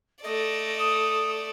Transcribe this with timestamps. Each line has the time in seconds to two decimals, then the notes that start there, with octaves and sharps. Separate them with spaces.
0.24 A3 D5 D#5
0.78 D#6